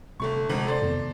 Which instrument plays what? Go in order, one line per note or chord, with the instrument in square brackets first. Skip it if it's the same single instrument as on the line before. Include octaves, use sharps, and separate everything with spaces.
[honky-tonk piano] G1 A3 C#6 [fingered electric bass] C3 G3
[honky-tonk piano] G#1 F2 [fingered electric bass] C3
[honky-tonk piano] A4 C5 D5
[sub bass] F2 [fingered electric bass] C3 D#3 B3